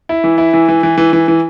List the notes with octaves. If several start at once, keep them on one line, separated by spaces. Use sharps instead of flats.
E4
E3
E4
E3
E3
E3
E3
E3
E3